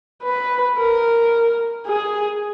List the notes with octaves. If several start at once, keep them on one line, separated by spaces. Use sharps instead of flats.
B4
A#4
G#4